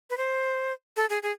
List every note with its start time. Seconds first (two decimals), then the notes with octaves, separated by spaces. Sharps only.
0.10 B4
0.17 C5
0.97 A4
1.10 G#4
1.23 G#4